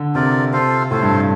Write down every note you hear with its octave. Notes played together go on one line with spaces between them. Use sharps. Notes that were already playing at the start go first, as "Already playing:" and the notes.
Already playing: D3
C3 F4 A#4 D5
C3 F4 A4 C5 F5
A2 F4 A4 C5 F5
G2